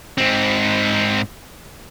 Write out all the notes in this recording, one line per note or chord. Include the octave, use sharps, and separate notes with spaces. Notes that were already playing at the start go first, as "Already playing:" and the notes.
G#2 C4